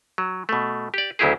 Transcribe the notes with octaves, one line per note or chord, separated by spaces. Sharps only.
F#3
B2 A3
G4 D5
D2 C#3 F#3 E4 G4 G#4